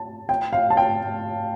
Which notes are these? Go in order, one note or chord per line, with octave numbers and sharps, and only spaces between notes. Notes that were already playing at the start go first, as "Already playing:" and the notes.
Already playing: A5
G5
F5
A5
G5